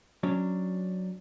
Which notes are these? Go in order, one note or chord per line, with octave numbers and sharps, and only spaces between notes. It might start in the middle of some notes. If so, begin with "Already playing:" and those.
F#3 C#4 D4